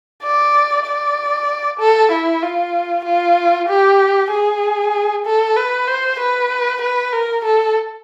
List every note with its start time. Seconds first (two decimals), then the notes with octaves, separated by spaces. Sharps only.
0.23 D5
0.86 D5
1.80 A4
2.12 E4
2.43 F4
3.05 F4
3.69 G4
4.31 G#4
5.26 A4
5.57 B4
5.87 C5
6.20 B4
6.82 B4
7.13 A#4
7.45 A4